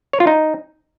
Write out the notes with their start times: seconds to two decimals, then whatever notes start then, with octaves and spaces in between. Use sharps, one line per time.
0.13 C#5
0.20 F4
0.27 D#4